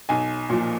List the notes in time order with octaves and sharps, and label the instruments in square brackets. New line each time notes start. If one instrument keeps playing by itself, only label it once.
[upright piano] B1 G#5
A#2 F3